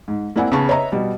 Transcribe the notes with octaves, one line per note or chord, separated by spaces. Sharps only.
G#2
A#3 C4 E4 D5 F#5 G#5
C#3 B3 A5 C#6
B4 C#5 D#5 E5 A#5
B2 G3